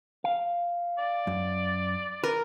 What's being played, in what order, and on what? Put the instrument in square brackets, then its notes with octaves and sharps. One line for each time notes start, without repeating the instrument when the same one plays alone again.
[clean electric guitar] F5
[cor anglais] D5
[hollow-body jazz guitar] F#2
[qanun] A#4 [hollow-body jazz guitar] B4